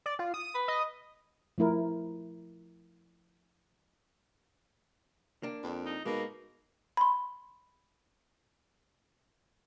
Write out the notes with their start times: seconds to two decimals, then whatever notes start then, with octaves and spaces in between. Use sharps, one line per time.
0.06 D5
0.19 F4
0.34 D#6
0.55 B4
0.68 D#5
1.58 F3 A3 E4 A#4
5.43 A#3 D4
5.63 F2
5.86 D#4
6.05 B2 G#3 A#3 D#4
6.97 B5 C6